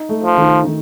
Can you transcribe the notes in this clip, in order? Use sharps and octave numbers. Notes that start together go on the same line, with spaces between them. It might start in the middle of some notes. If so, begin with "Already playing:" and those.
Already playing: D#4
A3
F3
D#3
D#3